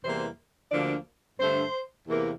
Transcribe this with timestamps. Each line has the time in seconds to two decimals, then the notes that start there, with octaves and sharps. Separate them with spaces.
0.04 E2 C3 E3 G3 A#3 C5
0.71 D2 D3 F3 A#3 D5
1.40 G2 D3 A3 C5
2.08 E2 C3 E3 A#3